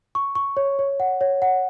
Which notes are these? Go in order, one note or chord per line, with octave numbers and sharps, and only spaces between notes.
C#6
C#6
C#5
C#5
F#5
C#5
F#5